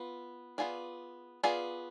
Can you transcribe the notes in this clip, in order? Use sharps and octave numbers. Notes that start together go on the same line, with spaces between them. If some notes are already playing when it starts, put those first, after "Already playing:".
Already playing: B3 F4
B3 F4 G#4 D5
B3 F4 G#4 D5